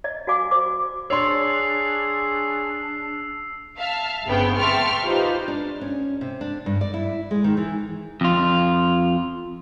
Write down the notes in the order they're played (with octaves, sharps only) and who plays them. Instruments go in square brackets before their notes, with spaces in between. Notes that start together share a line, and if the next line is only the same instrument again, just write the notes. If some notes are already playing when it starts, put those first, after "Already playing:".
[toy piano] D5 D#5
F#4 D5 F5 G#5 D6
C5 D6
F#4
[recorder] D4 [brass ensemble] G#4 [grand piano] C#5 D5 C6 [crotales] E6 C7 F7
[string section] E5 F5 A5 F6
G1 C#3 B3 C4 G5
E5 G5 A5 C6 C#6 F6
D#4 F4 G4 B4 C5
[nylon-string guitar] D4
C#4
C3
D4
G2
D5
E4
G#3
D#3
E3
[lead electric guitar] F2 F4